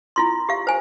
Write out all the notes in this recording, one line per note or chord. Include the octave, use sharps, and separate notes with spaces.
E4 F4 C6
G4 F5
C5 G#5